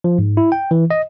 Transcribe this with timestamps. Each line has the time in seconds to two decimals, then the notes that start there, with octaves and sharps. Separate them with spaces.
0.04 F3
0.19 G#2
0.37 E4
0.52 G5
0.71 E3
0.91 D#5